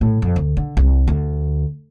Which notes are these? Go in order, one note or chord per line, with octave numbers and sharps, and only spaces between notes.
A2
F2
D2
D3
C2
D2